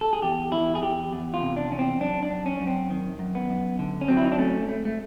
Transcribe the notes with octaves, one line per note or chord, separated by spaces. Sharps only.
A4
G#4
E2 G4
E2 E4
G#4
E2 G4
E2
F4
C3
D4
E2 C#4
C4
F#2 D4
D4
F#2
C#4
F#2
C4
D#3
F#2
B3
F#2
D3
C#4
F#3 C4
E4
D#4
D4
A3 C#4
A3
A3